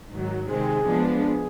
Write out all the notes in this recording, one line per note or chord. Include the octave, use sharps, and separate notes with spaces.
G#2 D#3 F#3
C3 D#3 G#3 C4 G#4
F3 G#3 B3 D4
G#4